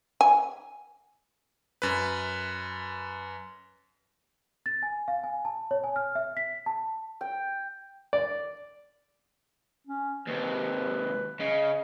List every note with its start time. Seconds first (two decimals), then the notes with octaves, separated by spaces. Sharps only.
0.21 G#5
1.82 F#2 B4
4.66 A6
4.83 G#5
5.08 F5
5.24 G#5
5.45 A5
5.71 C#5
5.84 G#5
5.96 F6
6.15 E5
6.37 B6
6.66 A5
7.21 G5
8.13 D5
9.87 C#4
10.28 D#2 C3 B4
11.40 C#3 D#5